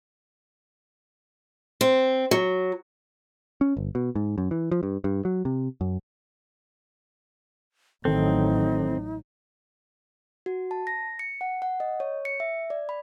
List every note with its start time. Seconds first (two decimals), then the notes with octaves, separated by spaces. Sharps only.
1.81 C4
2.31 F#3
3.61 C#4
3.77 G1
3.95 B2
4.15 G#2
4.38 F#2
4.51 E3
4.72 F3
4.83 G2
5.04 G2
5.25 F#3
5.45 C3
5.81 F#2
8.05 A1 D#3 F#3 C4 D#4 A4
10.46 F#4
10.71 A5
10.87 A#6
11.19 C#7
11.41 F#5
11.62 F#5
11.80 D#5
12.00 C#5
12.25 C#7
12.40 E5
12.70 D5
12.89 B5